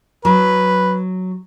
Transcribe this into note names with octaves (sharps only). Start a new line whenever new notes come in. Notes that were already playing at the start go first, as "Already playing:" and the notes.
F#3 B4